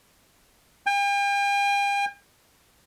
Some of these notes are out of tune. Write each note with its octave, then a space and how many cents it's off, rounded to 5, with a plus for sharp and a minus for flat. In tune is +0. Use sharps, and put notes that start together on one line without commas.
G5 +45